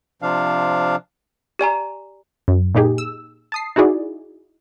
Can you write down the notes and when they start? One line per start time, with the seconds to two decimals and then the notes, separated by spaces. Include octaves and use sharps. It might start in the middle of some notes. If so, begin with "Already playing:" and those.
0.22 C3 F3 D4 F5
1.59 G4 D5 G#5 A#5
2.48 F#2
2.75 A#2 A#3 D#4 G4 G#4
2.98 E6
3.52 A5 D#6 C7
3.76 D#4 E4 F#4 G#4 D5